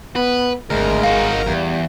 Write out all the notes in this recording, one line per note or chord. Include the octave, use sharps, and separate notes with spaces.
B3 B4
G#1 D2 G#3 A#4
D#4 F#4 F5
E2 G3